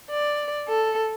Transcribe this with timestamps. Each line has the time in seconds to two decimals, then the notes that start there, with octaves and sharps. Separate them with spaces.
0.10 D5
0.68 A4